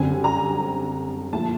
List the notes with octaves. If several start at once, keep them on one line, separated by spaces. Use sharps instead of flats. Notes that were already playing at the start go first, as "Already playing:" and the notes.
Already playing: F#2 D3 G3 C4 G#5
A#5
A#2 F3 A3 A5